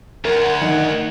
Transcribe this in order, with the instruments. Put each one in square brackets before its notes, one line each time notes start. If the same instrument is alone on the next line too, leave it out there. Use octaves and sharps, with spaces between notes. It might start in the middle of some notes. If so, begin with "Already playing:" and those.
[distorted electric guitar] D2 [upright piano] A#4 [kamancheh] F#5 G#5
[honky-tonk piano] D#3 D#4